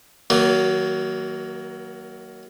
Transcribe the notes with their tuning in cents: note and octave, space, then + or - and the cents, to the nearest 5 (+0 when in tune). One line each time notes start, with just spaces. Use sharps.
D#3 +45 F#3 +25 A#3 +0